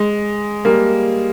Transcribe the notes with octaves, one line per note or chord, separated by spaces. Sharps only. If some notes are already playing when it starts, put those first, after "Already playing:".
Already playing: G#3
G3 A#3